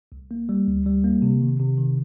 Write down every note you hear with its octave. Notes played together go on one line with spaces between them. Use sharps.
C2
A#3
G3
D2
G3
A#3
C3
D#3
C3
D#3